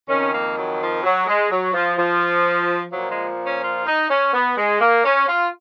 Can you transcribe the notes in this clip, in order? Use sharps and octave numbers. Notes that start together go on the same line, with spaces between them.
F2 D#3 C#4
A#3
F#3
F3
F#3
G#3
F#3
F3
F3
A#2 F3 F#3
G#3
C#4
F4
D#4
C#4
B3
G#3
A#3
C#4
F4